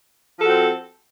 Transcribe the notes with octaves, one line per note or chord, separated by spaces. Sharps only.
F3 C4 F#4 A4